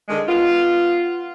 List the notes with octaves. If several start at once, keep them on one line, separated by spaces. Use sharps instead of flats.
D3 D#3 G#3
B3 F4